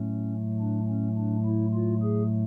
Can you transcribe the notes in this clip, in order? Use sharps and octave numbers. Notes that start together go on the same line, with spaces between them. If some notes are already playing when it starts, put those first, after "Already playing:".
Already playing: A2 F#3 A3 C#4
D4
C#4
D4
E4
F4
G#4